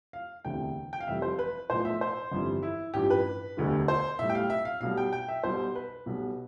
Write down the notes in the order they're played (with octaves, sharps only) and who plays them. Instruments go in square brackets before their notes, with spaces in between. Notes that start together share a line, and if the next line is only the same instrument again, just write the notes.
[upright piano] F5
E1 D2 C3 E3 G5
G5
F5
F1 F2 E3 G3 E5
C5
B4
B1 A2 F3 C5
E5
C5
G1 F2 E3 G3
E4
A1 G2 F3 G4
B4
E1 D2 D3 G3
C5
B1 A2 G3 E5
G5
F5
E5
F5
B1 B2 G3 F5
G5
G5
E5
B1 B2 G3 C5
B4
B1 B2 G3